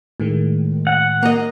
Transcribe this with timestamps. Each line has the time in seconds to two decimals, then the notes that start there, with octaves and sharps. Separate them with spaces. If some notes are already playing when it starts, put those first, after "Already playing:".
0.20 A2 D#3 G#3
0.87 F#5
1.23 A#3 D#5